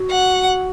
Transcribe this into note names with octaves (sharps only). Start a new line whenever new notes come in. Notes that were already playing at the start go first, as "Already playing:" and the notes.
Already playing: F#4
F#5